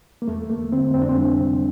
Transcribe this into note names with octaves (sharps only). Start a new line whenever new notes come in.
A#3
E2 A3
A3 A#3
D3 C4
F2 C4
D4
C4
G3
C3